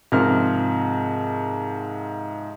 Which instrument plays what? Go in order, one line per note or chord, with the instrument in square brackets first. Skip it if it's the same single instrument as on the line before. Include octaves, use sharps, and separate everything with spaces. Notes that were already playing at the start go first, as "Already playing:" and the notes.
[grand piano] G#2 C3 F3 A#4 F6